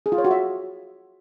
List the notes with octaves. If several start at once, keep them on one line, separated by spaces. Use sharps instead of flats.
G#4
F4
C#5
F#4
E5